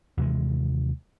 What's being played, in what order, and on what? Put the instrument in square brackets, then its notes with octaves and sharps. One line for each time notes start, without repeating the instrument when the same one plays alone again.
[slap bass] D#2 C3 E3 G#3